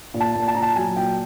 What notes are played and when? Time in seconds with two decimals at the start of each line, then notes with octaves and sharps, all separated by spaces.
0.14 A#2
0.20 A5
0.35 A#2
0.48 A5
0.55 A#2 A#5
0.63 A5
0.76 F#3 G#5
0.96 A#2 G5